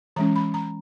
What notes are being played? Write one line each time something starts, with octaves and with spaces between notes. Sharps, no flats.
E3 G#3 C#4 A#5
B5
A#5